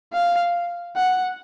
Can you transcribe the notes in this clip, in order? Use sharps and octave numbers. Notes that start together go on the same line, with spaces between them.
F5
F#5